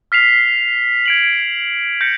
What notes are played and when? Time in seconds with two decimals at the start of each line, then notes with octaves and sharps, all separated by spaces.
0.12 F6 B6 C7 F7
1.05 G#6 D7 F#7
2.01 G6 A#6 C#7